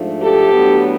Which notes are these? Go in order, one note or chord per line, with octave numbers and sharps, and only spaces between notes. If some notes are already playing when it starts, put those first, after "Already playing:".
Already playing: G#2 F3 A3 D4
G4 A4
A2 F#3 B3 D4